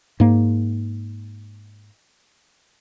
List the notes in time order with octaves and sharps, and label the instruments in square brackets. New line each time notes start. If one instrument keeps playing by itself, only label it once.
[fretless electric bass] G#2 A#3